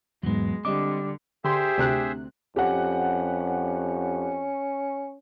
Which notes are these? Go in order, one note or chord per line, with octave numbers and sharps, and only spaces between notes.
E2 G#2 F#3 G#3 B3
D3 G3 C4 D4 D#5 D6
D3 G4 G#4 C5 E5 C6
D2 C3 F#6
F2 C#4 G4 F#5